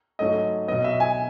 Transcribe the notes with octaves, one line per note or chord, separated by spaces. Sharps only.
G#2 F#3 A3 C#4 D#5
B2 F#3 B3 D#5
E5
G#5